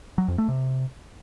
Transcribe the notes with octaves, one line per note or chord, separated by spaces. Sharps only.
F#3
F2
A3
C3